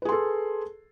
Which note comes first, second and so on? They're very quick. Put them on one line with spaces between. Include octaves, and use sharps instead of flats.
B4 G#4 C6 A4